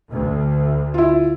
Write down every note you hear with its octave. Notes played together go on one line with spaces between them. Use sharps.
D2
E4 F4